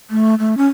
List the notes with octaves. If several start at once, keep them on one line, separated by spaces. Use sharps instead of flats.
A3
A3
C#4